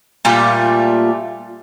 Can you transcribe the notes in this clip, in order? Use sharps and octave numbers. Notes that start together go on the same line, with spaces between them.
A#2 G3 A3 F4